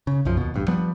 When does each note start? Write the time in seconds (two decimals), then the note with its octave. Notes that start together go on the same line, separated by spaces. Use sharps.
0.07 C#3
0.25 B1 F#2 F3
0.37 D#2 B2
0.54 A1 G2
0.68 F3 G3 B3